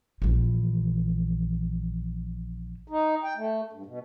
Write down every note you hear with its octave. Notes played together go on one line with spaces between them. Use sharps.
A#1 E3
D#4
G5
A3
G2
B2